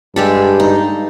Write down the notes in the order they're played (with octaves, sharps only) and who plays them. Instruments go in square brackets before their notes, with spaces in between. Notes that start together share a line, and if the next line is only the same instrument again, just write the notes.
[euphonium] G2 [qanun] G#3 G4 A4
[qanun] D#4